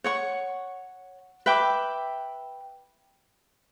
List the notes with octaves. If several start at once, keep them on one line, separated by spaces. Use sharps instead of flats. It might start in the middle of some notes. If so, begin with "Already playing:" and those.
C#5 F#5 C#6
B4 E5 G5 D6